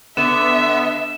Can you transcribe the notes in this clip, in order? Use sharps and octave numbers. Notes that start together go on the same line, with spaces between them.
D3 B3 E5 E7